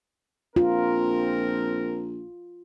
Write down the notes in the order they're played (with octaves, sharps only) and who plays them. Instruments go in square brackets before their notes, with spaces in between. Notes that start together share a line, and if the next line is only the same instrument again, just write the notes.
[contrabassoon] A#1 [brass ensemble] C4 A#4 [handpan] F4